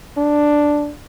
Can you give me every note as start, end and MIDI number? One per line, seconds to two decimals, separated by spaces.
0.17 0.92 62